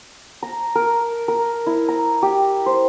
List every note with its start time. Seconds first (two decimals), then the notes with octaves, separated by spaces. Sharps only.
0.43 A#5
0.76 A#4
1.28 A#4
1.67 E4
1.89 A#5
2.23 G4
2.66 C5